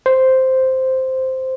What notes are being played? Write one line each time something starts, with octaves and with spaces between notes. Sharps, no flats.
C5